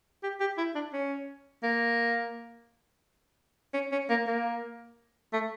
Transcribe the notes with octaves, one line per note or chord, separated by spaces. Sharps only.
G4
G4
E4
D4
C#4
A#3
C#4
C#4
A#3
A#3
A3